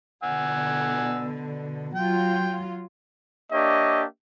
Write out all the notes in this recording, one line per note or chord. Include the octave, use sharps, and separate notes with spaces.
B2 D3 F#5 G#5 E6
F#3 F4 G5
A#3 D4 G4 C#5 D#5 E5